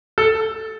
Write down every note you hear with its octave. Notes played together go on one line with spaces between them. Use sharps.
A4